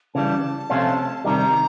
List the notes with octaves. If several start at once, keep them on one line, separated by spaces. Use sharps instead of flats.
C#3 E3 G3 A5
C3 F3 A3 C#4 F4
C3 D#3 G3 A#5